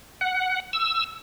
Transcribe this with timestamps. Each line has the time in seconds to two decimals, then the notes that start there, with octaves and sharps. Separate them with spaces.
0.21 F#5
0.73 E6